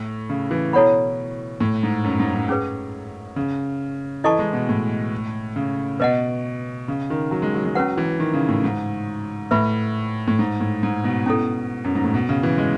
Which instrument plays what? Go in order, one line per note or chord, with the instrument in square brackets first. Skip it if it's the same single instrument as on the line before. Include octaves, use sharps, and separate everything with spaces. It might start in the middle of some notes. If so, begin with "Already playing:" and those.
Already playing: [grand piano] A2
C#3
E3
[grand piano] B2 [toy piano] E4 A4 C#5 F#5 B5
[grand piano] A2
G#2
F#2
G#2
G#2
[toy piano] C#4 G#4 B4
[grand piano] C#3
[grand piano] E3 [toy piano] E4 A4 D#5 A5 C#6
[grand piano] G#3
B2
A2
C#3
[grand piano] B2 [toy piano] B4 D#5 F#5
[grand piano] C#3
D#3
F#3
G#3
F#3
G#3
[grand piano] F#3 [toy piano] C#4 F#4 B4 F#5
[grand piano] E3
D#3
C#3
A2
G#2
[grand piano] A2 [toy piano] B4 E5 B5
[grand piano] A2
G#2
A2
G#2
B2
[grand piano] B2 [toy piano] C#4 E4 A4
[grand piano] F#2
G#2
A2
B2
C#3
E3
G#3